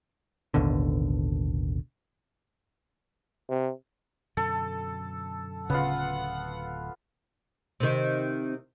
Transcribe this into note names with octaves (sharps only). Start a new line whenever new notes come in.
A1 D#2 B2 D3
C3
F#2 B2 D3 A4
D1 C#3 B3 F4 F#5
C3 D#3